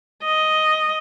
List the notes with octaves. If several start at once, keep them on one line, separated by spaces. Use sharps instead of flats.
D#5